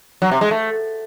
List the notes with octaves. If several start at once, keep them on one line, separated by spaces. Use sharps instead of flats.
F#3
C3
G#3
A3